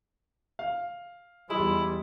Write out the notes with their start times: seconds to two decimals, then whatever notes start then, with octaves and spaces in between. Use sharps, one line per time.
0.59 F5
1.50 E2 G3 G#3 E4